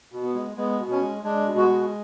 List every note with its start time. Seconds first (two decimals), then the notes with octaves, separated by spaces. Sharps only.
0.12 B2
0.23 B3
0.34 G#3
0.56 G#3 B3
0.79 B2
0.91 C#4
1.01 G#3
1.23 G#3 D4
1.46 B2
1.57 F#4
1.68 G#3